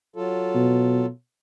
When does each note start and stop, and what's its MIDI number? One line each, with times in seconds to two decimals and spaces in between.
0.16 1.06 54
0.16 1.06 65
0.16 1.06 69
0.55 1.08 47